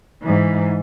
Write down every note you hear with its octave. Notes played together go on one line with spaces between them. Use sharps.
G#2 E3